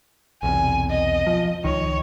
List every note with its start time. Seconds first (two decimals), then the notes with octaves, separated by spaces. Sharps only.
0.43 B1 E2 C3 G#5
0.90 D#5
1.27 F3
1.64 C#2 D#3 C#5